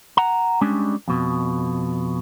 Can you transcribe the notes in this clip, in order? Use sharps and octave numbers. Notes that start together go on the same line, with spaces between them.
F#5 A#5
G3 G#3 C#4 D4
F2 B2